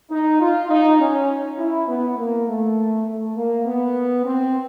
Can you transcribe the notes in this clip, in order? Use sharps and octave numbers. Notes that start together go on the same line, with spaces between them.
D#4
F4
D#4
C#4
E4
B3
A#3
A3
A3
A#3
B3
C4